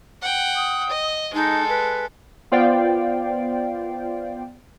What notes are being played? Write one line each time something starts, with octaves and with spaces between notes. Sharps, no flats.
F#5 G5
D#6
D#5
G#3 D#4 A4
B4
B3 F4 C5 D5 F5 G5